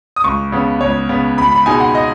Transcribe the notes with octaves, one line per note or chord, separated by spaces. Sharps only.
D#6
C#2 C#6
C#3 B3
C#2 C#5
C#3 B3
C#2 B5
B5
B2 G#3 D#4 G#5
F#5
D#5